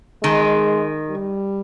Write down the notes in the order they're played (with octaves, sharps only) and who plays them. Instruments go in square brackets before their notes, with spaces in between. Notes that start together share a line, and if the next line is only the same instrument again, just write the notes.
[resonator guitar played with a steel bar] D#3 [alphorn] G#3
[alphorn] G3